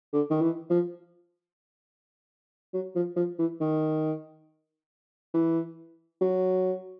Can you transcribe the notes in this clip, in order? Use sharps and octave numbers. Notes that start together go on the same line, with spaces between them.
D3
D#3
E3
F3
F#3
F3
F3
E3
D#3
E3
F#3